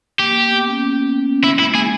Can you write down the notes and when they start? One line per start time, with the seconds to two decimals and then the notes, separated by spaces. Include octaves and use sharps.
0.19 A#3 G4
0.35 A#3
0.51 B3
0.66 C#4
0.82 C#4
1.02 B3
1.23 C#4
1.44 E4
1.54 G#3
1.59 E4
1.64 A#3
1.75 G#4